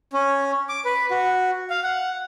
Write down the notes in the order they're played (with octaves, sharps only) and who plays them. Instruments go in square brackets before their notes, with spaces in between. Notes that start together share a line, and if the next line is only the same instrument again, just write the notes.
[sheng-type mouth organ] C#4
D6
B4
F#4
F5
F#5